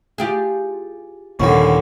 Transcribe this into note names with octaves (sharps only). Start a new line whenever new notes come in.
F4 G4 G#4
D#2 A#2 D3 B3 C#4 F#5 G5